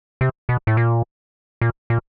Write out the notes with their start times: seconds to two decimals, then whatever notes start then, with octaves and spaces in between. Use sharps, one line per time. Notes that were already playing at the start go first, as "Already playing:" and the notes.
0.21 C3
0.49 B2
0.67 A2
0.77 A#2
1.61 A#2
1.90 A#2